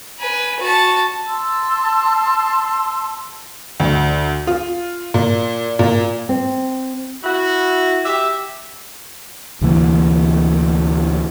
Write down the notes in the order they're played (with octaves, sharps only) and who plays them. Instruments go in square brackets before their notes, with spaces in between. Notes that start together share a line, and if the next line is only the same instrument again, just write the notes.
[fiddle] B4 G#5
F#4 A5
[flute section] A5 C6 E6
[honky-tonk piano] D2
F4
A#2
A#2
[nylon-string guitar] C4
[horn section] E4 F#4
G4 E5
[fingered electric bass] D2 C3 E3 A#3